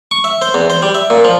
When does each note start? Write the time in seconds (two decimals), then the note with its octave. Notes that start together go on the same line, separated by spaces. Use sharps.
0.11 C#6
0.24 E5
0.42 C5
0.54 E2
0.70 C5
0.82 G3
0.95 E5
1.10 A#2
1.24 F3